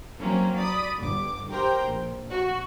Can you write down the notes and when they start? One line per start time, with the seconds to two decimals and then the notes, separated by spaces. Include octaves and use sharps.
0.19 F#3 A#3 C4 C#4
0.57 D5 B5 D#6
0.98 G1 D6
1.50 G4 A#4 C5 G5
1.85 A#1
2.32 F#4